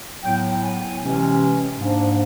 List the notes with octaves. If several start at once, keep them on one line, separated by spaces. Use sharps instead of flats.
A2 F#3 B3 G5
G#5
C3 E3 G#3 C#4
G#2 F3 A#3 D4